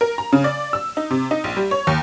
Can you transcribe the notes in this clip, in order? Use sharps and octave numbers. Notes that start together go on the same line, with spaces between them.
A#4
A#5
C#3
D5
E6
D#4
C3
D#4
A#1
G3
C#5
D#2